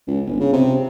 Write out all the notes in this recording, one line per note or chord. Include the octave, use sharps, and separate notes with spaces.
C#2
G1
C#3
C3